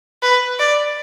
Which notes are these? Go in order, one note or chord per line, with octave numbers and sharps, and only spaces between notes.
B4
D5